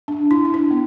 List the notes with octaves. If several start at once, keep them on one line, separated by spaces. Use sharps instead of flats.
D4
E4
D4
E4
B3